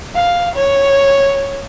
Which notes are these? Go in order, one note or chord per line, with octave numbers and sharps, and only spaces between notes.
F5
C#5